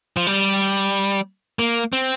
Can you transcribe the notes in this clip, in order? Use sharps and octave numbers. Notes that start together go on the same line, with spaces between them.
F3
G3
A#3
C4